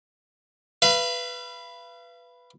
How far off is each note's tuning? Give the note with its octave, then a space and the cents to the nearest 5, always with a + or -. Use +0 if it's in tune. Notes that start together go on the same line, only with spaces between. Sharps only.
B4 +0 F5 -40